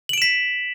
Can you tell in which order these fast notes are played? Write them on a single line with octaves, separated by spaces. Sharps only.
F#7 D7 E7 B6